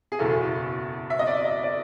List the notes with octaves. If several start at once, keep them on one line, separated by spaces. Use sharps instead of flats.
G#4
F#1 E2 B2 A4
E5
D#5
D5
D#5
D5